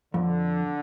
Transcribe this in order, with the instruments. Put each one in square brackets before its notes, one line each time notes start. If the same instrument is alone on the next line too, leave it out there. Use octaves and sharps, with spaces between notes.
[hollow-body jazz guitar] F2 [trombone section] D3